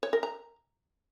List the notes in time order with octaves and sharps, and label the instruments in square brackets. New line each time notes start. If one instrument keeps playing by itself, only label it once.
[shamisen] C#5
A#4
A#5